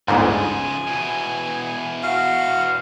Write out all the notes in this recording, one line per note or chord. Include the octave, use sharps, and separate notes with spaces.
G1 D2 G#2 C#3 F3 G#5
E2 B2
F#4 F5